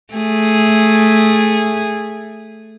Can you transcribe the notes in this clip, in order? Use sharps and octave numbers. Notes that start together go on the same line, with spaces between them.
A3 G#4